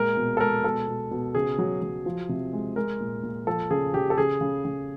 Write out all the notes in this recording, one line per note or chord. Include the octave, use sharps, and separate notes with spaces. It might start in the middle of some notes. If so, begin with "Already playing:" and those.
Already playing: A#2 G#3 A#4
B2
A4
G#3 A#4
B2 A4
B2
B2
C#3 G#4
F#3
F#3
F3
C3
G#3
G#3 A#4
A#2
A#2
F3 A4
C#3 G#4
C#3 G4
A4
C#3 G#4
C#3
C#3